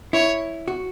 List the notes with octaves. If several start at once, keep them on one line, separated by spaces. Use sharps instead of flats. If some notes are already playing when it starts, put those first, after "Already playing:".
E4 C#5
F#4